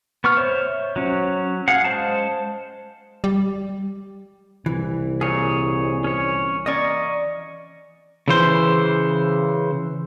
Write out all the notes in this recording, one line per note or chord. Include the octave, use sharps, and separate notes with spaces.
B3 C#6 F6
C5 C#5 E5
F#3 C#4
G#4 F5 F#5
G#3 C5 F5 A5
G3
C2 E3
A#2 G#4 C#5
C#4 C#5
A#3 C#4 D5 D#5 C#6
C#3 E3 C5